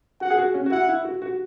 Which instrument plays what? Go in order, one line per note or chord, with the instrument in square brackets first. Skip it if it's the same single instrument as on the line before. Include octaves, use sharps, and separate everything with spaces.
[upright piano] F#4 [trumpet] F#5
[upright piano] G#4
F#4
C#4
F#4
[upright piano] E4 [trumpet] F#5
[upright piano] E4
F#4
F#4